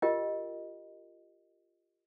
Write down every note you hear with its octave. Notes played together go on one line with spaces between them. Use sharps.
F4 G4 A#4 D#5 G5